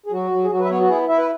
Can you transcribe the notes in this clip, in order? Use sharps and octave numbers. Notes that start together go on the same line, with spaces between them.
G#4
F#3 F#4
F#3
G#4
F#3 F#4
B4
E5
B3 C#5
F#4
E4 G#4
E4 E5
B4